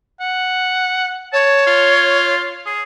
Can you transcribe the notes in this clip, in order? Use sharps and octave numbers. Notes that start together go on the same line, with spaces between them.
F#5
C#5 A5
F4
G#4